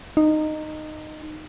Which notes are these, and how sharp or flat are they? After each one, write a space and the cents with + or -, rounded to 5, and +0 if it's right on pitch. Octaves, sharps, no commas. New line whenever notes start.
D#4 -15